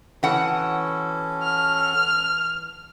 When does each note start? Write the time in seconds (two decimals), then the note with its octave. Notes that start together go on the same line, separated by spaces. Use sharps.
0.23 E3 C#4 F#4 A4 F#5
1.43 F6